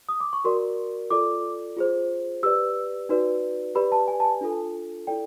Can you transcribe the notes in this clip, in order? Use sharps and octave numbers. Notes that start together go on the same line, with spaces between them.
D#6
D6
C#6
F#4 A#4 D5 C6
F4 A4 D5 D6
F4 G#4 C5
G4 B4 D5 E6
D#4 F#4 B4 D5
G4 B4 D5 B5
A5
G#5
A5
G#5
D4 F4 A4
E4 A4 D5 G5